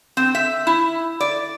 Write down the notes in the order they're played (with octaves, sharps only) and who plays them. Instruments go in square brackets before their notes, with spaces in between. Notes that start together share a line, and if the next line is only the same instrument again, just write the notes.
[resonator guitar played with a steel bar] C4
E5
E4
D5